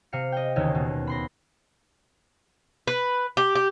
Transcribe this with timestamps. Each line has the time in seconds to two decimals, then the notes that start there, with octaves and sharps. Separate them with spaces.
0.13 C3 F5 C#7
0.32 D#5 G5
0.56 E1 D#2 C#3 C#4
0.75 B2
1.07 B5 C6 A#6
2.87 B4
3.37 G4
3.55 G4